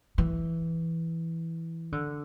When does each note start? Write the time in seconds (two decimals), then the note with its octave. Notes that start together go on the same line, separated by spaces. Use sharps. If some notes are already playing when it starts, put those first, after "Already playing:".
0.18 E3
1.92 D3